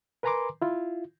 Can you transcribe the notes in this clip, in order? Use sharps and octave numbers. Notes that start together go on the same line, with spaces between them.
A#4 B4 G#5 A#5 C6 D6
E4 F4